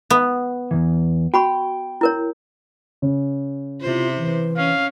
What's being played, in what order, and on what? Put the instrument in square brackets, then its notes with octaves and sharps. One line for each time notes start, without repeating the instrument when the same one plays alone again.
[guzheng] B3
[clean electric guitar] E2 G#2 E3
[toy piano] F#4 B5 C#6 [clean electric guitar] G5
[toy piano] E4 A#4 C#5
[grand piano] C#3
[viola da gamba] C3 E4 C5 [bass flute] F4
[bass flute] E3
[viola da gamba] C#4 [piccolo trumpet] F5